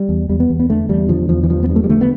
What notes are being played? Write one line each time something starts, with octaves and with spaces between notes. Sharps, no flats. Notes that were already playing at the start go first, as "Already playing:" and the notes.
Already playing: G3
E2
E2 G3
B3
E2
B3
D3 A3
E2 G3
D3 F3
E2 F3
E3
G2 F3
B3
G2
A3
G3
D3 A3
B3